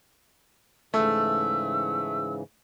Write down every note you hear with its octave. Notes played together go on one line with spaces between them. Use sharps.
G#2 C#3 E3 A3 E6